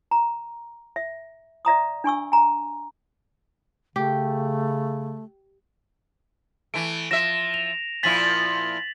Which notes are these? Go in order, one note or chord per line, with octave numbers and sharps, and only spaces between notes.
A#5
E5
D5 E5 A#5 D#6
D4 G#5 C#6 E6
G#5 A#5
C#3 A3 G4
E3 A3 D7
F3 E5 A#6 E7
F7
A#2 F3 E4 A6 B6 F#7